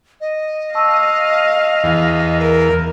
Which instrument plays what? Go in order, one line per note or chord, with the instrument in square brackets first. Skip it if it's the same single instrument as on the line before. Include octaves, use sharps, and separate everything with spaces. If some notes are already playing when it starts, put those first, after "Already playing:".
[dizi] D#5
[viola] F5 [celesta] A5 C#6 E6
[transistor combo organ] E2
[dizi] A#4